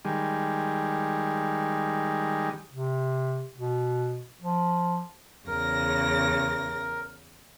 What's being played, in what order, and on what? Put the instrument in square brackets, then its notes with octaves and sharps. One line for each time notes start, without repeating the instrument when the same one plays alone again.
[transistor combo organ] D#3 G3 G#3
[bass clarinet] C3
B2
F3
[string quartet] E2 C#3 A#6 [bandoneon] A#4